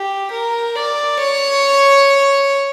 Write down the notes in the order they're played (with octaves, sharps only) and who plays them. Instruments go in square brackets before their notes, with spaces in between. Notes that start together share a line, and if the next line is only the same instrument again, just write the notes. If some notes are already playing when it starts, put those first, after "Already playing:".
Already playing: [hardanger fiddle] G4
A#4
D5
C#5